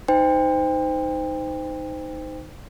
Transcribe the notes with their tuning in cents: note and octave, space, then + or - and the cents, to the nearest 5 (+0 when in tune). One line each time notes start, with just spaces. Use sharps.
D#4 +0 C5 -25 G5 +30